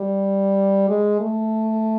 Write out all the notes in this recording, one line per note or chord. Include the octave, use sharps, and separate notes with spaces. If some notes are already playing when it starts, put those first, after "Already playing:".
Already playing: G3
G#3
A3